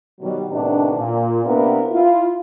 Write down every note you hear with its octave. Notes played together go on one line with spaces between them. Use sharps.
B2 D#3 F#3 G3
A2 C3 D#3 B3 D4
A#2
C3 A#3 B3 D4 E4 A#4
E4 F4